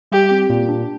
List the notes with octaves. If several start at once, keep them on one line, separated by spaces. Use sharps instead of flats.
G3 G4
C4
A#2
D4